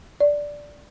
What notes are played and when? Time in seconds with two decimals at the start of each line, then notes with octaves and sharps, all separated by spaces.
0.20 D5